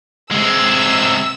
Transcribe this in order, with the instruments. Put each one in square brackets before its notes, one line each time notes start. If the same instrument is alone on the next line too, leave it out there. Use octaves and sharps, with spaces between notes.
[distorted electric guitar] C3 G#3 [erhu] E6